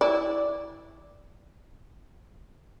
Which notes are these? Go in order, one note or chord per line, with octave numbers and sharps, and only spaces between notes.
E4 D5